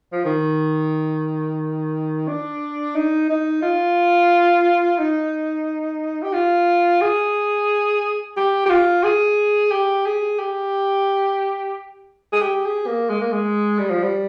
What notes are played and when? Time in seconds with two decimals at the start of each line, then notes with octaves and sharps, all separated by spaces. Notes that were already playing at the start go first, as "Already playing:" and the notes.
0.13 F3
0.25 D#3
2.28 D4
2.95 D#4
3.29 D#4
3.62 F4
4.98 D#4
6.22 G4
6.33 F4
7.02 G#4
8.37 G4
8.66 G4
8.70 F4
9.04 G#4
9.71 G4
10.06 G#4
10.39 G4
12.32 G#4
12.42 G4
12.66 G#4
12.87 A#3
13.10 G#3
13.21 A#3
13.32 G#3
13.78 G3
13.90 F3
14.03 G3